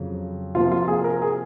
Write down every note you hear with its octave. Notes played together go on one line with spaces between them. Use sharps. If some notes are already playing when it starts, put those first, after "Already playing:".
Already playing: F2 C#3 F#3
C3 F3 A#3 F4
F4
G#4
A#4
G#4